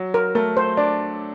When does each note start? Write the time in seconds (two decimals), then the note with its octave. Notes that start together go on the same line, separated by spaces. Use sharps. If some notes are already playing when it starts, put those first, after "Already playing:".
Already playing: F#3
0.14 A#4
0.35 A3 A#4
0.57 C5
0.77 D4 D5